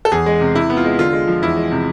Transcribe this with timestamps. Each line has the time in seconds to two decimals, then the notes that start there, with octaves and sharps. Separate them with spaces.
0.05 A4
0.11 E2 G#4
0.26 G#3
0.41 C3
0.55 C3 E4
0.70 B3
0.77 F4
0.85 G#3
0.99 D3 F4
1.13 G#3
1.27 F3
1.42 E2 E4
1.57 G#3
1.72 C3